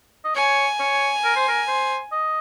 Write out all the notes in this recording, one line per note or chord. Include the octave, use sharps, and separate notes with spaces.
D#5
C#5 G#5
C#5
A#4
C5
A#4
C5
D#5